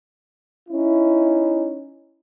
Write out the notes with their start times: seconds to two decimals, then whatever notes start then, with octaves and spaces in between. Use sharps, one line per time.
0.69 C#4 D#4 E4